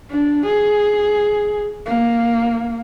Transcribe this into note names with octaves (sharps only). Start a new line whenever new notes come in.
D4
G#4
A#3